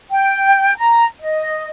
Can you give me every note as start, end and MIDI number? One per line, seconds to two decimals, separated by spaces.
0.11 0.77 79
0.78 1.05 82
1.21 1.69 75